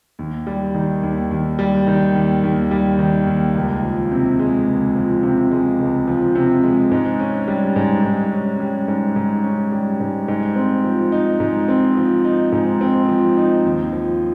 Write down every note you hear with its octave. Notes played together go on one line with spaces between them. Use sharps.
D#2
G3
D#3
D#2
D#2
G3
D#3
D#2
D#2
G3
D#3
D#2
C#2
F3
C3
G#3
C#2
F3
C3
G#3
C#2
F3
C3
G#3
G#2
C#4
G3
G#2
G#2
C#4
G3
G#2
G#2
C#4
G3
G#2
G#2
C4
F3
D#4
G#2
C4
F3
D#4
G#2
C4
F3
D#4
D#2
F3